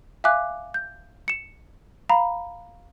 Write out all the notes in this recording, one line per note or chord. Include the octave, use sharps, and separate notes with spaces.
E5 F5 G#5 D6 F#6
G6
C#7 E7
F5 A#5 B5